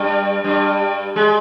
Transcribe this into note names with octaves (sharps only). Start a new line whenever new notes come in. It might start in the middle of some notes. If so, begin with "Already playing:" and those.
Already playing: G2 G3
G2 G3
G#3